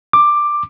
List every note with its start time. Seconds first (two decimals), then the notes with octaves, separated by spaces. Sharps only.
0.13 D6